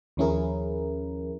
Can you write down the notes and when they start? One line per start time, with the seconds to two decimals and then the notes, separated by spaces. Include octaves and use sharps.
0.17 D#2 F3 C#4 E4 G#4 A#4